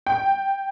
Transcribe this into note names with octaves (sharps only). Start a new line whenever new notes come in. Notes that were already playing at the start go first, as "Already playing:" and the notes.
G5